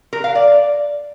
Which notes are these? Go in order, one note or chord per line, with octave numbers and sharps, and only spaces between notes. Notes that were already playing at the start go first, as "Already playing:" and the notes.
A#4
F5
D5